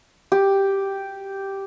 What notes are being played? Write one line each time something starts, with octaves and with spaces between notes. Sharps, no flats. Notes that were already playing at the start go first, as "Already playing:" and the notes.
G4